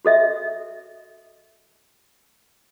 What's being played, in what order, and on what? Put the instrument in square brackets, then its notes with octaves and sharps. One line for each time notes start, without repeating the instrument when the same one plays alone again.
[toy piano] F#4 A4 D#5 E5